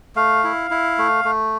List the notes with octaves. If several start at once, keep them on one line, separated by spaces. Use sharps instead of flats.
A3 F5
E4
E4
A3
A3